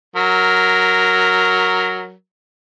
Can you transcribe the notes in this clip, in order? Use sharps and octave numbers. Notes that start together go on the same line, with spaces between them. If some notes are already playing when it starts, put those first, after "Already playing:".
F#3 A#4